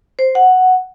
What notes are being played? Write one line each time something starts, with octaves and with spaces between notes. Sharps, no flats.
C5
F#5